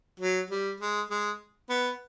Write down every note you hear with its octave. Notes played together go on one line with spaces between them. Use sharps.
F#3
G3
G#3
G#3
B3